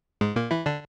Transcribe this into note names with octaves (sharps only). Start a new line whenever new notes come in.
G#2 G#3
A#2 A#3
E3 E4
D3 D4